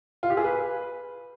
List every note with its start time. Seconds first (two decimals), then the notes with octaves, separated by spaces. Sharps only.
0.23 F4
0.30 G4
0.37 G#4
0.44 B4